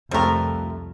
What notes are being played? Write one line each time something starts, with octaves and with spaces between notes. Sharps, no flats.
C2 F2 F3 G3 A3 C4 A#4